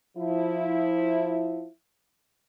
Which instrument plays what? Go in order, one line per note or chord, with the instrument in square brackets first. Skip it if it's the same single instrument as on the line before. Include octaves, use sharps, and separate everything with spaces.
[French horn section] F3 E4